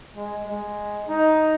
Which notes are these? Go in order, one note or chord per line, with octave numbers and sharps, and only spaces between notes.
G#3
G#3
D#4